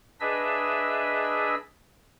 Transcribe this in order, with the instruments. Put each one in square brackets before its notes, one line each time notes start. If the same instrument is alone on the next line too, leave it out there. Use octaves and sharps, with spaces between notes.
[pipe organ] D4 G#4 B4 D#5 E5 E6